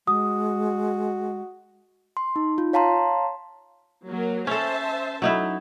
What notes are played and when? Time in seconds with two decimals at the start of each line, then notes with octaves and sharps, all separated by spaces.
0.08 G#3 F#4 D#6
2.17 C6
2.36 D#4
2.58 F4
2.73 C#5 F5 A5 A#5 C6
4.06 F#3 A#3 A#4
4.47 C#4 A4 C5 E5 A5
5.22 F#3 D#4 E4 A4